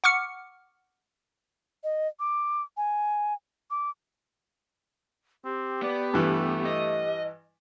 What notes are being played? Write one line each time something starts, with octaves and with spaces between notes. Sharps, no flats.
F#5 C#6 D6 F6 C#7
D#5
D6
G#5
D6
C4 G4
B3 D5
G2 E3 A3
D#5